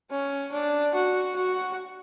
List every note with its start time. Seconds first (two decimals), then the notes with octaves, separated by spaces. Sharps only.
0.11 C#4
0.52 D4
0.94 F#4
1.36 F#4